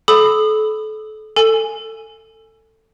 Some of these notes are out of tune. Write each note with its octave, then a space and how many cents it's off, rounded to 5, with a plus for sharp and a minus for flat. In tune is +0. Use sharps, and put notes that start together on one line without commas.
A4 -30 B5 +15 D#6 -35
A4 +20 G#5 +0